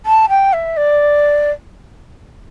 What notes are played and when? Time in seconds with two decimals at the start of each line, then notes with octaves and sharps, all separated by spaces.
0.05 A5
0.29 G5
0.53 E5
0.76 D5